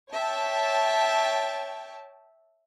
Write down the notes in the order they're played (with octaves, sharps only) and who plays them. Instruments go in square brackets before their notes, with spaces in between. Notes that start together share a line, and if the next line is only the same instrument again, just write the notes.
[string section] C#5 E5 G5 A5